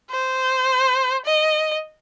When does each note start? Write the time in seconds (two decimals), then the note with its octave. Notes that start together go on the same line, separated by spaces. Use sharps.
0.10 C5
1.25 D#5